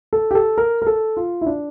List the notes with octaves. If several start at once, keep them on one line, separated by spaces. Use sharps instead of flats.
A4
G4
A4
A#4
A#4
A4
F4
E4
D4